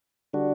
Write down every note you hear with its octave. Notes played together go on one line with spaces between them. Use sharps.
D3 G3 D4 F#4